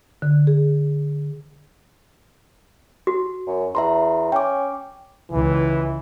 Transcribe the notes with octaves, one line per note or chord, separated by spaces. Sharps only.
D3
G#4
F#4
F#2
E2 E5 A#5 C6
C#4 G5 D6
C#2 E3